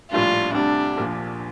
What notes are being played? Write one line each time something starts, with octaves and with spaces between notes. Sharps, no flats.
A#1 A2 G3 D4 F4
D2 C3 G3 D4
A#1 A#2 F3